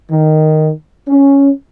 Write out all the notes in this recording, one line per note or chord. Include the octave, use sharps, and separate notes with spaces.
D#3
C#4